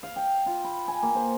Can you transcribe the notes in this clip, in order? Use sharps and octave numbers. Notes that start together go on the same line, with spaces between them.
F5
G5
F4
B5
G#5
A#3
C5